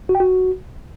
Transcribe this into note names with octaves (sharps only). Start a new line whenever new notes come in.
F#4
G5
F#4